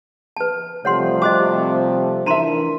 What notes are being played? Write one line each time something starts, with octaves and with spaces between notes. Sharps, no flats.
B4 A5
C3 F3 G3 A3 C#5 F#5 C6
F#4 C5 D#5 D6
E3 D4 D#4 A#4 E5 A#5 C6 D#7